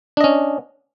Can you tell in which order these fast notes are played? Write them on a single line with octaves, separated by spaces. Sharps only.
D4 D#5 C#4